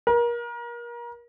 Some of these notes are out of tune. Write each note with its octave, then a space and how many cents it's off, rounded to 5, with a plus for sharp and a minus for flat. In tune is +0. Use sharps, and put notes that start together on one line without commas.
A#4 +30